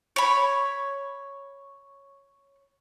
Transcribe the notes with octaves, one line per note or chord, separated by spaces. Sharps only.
C#5 B5